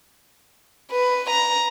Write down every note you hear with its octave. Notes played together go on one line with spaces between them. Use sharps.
B4
A#5